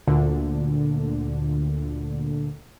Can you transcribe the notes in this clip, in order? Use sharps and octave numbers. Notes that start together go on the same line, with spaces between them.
D2 A#2 D3